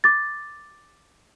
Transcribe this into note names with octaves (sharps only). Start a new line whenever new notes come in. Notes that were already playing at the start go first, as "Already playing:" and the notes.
D6 A6